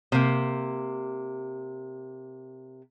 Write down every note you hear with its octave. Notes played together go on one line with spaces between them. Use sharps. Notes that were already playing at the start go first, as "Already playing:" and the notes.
C3 A#3